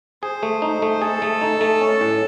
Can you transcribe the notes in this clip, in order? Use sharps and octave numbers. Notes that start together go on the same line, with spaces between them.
G#4 C5
A3
D#4
A3
G#4 A4
A3
D#4
A3
C#4
A2